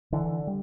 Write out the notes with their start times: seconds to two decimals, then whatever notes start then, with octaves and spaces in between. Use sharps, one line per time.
0.12 D3 E3
0.47 G3